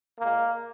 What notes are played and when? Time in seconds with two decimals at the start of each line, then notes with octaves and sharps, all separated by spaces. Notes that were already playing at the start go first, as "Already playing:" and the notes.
0.18 A#2 G#3 A#3